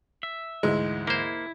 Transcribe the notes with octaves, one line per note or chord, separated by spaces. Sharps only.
E5
D2 G#2 E3 G#3
A#3 E4 C5